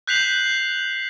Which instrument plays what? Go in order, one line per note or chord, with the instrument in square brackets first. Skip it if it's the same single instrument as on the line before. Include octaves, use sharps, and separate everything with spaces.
[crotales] F#6 G6 B6 C7 F7 F#7